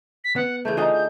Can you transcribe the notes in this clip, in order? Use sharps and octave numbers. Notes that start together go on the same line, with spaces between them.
B6
B3 F#5
C#3 E3 A3 G6
D3 D#4 F4 G#4 D#5
G6